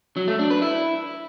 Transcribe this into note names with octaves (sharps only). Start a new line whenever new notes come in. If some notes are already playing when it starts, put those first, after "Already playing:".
F#3
A3
D4
B4
E4